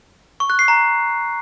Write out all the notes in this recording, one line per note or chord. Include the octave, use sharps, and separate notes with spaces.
C#6
F#6
C7
A#5